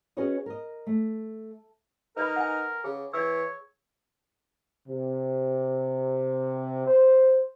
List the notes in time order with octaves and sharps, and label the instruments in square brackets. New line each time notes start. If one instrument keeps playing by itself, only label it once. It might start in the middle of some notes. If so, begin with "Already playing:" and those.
[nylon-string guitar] C#4 F#4 G#4 B4 C#5 D#5
A#4 D#5
A3
[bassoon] D#4 [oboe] A#4 [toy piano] B4 D5 B5
[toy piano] F#5 G#5
[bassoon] C#3 [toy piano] G#4
[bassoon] E3 [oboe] C#5 [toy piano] D5 E6
[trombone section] C3
C5